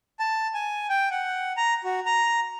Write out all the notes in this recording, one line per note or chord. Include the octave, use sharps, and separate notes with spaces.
A5
G#5
G5
F#5
A#5
F#4
A#5